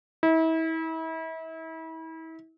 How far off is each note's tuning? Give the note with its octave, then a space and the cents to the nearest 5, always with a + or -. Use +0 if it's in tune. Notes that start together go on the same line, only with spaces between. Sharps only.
E4 -35